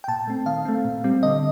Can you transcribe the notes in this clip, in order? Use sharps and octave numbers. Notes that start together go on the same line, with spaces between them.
G5
A#2 A5
A3 C4
D#3 F5
A3 C4
A#2
G3 C4
D3 D#5